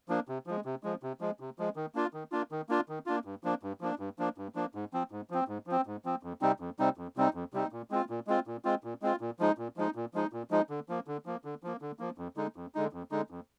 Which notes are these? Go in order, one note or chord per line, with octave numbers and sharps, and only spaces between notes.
F3 A#3 D4
C3
F3 G#3
C3
F3 G#3
C3
F3 G#3
C3
F3 G#3
D#3
A#3 D4 F4
D#3
A#3 D4 F4
D#3
A#3 D4 F4
D#3
A#3 D4 F4
G2
F3 A#3 D4
G2
F3 A#3 D4
G2
F3 A#3 D4
G2
F3 A#3 D4
G#2
F3 C4
G#2
F3 C4
G#2
F3 C4
G#2
F3 C4
F2
C3 G3 C4 D#4
F2
C3 G3 C4 D#4
F2
C3 G3 C4 D#4
F2
C3 G3 C4 D#4
A#2
G#3 C4 F4
A#2
G#3 C4 F4
A#2
G#3 C4 F4
A#2
G#3 C4 F4
A#2
F3 G#3 D#4
A#2
F3 G#3 D#4
A#2
F3 G#3 D#4
A#2
F3 G#3 D#4
D3
F3 A#3
D3
F3 A#3
D3
F3 A#3
D3
F3 A#3
F2
D3 G#3 D#4
F2
D3 G#3 D#4
F2
D3 G#3 D#4
F2